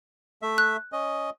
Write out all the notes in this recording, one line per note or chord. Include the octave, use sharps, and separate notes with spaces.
A3 E5
F#6
C#4 D#5